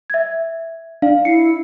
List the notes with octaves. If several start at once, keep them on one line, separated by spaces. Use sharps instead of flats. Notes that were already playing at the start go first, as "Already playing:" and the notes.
E5 G#6
D4 F5
E4 C7 C#7